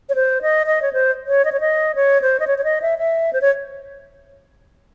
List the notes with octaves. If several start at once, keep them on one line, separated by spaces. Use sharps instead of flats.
C#5
C5
D#5
D#5
C#5
C5
C#5
D#5
C#5
D#5
C#5
C5
D#5
C#5
C#5
D#5
E5
E5
C5
C#5